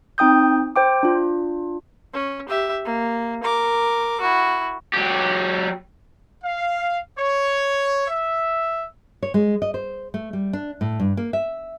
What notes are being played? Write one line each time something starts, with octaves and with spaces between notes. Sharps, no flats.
C4 D#4 G5 D#6 G6
C5 G5 D6
D4 F4
C#4
G4 E5
A#3
A#4 D6
E4 F#4
F#3 G4
F5
C#5
E5
C#5
G#3
D#5
C5
A3
G3
D4
A2
G2
A#3
E5